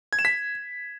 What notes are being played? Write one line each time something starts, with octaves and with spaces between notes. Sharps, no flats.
G#6
E7
B6